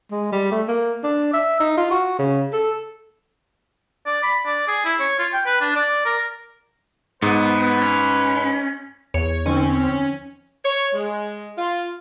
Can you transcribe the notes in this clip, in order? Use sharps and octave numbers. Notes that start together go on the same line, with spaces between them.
G#3
G3
A3
A#3
D4
E5
D#4
F4
F#4
C#3
A4
D5
B5
D5
G#4
E4
C#5
F4
G5
B4
D4
D5
A#4
G#2 B3 B4
C#4
E2 C#5
D3 F3 C4 C#4 D#4
C#5
G#3
F4